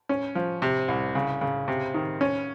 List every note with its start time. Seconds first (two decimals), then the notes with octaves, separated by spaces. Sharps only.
0.09 C#4
0.35 F3
0.62 C3
0.88 C2
1.15 C#3
1.41 C#3
1.68 C3
1.94 D#3
2.21 C#4